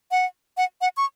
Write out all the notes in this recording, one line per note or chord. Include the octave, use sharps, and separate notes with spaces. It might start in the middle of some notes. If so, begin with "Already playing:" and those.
F#5
F#5
F#5
C#6